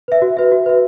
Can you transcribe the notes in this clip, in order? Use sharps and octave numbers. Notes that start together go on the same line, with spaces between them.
B4 E5
F#4
B4 E5
F#4
B4 E5